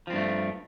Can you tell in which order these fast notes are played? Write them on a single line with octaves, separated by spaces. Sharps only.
F3 C4 G2 A3